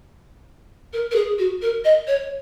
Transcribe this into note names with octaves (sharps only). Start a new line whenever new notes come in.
A#4
A#4
G#4
F#4
A#4
D#5
C#5